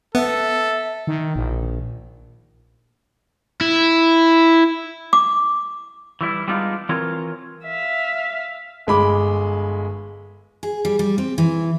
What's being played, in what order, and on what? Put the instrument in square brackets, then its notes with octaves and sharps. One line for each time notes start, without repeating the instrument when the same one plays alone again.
[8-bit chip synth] B3 [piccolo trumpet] A4 [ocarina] E5
[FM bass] D#3
A#1
[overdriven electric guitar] E4
[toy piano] D6
[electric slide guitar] E3 G3 E4
G3 G#3 B3 D4 D#4 F4
E3 C4 F4 A#4 C#5
[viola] E5 F5
[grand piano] G1 G#3 B5 D6
[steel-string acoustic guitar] G#4
G3
G3
C4
E3